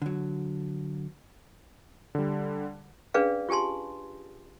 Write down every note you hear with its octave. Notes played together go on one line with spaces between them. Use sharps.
D3 F#3
D3 G3
C#4 D4 G#4 B4 D5 F5
F4 G4 G#5 A5 C6